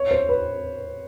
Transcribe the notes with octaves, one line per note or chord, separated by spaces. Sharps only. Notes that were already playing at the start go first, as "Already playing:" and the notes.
Already playing: C#5
C5
B4